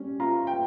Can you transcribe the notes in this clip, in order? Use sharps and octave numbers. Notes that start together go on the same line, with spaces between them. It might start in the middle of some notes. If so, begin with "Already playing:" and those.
Already playing: G3 C#4
F4 A#5
G5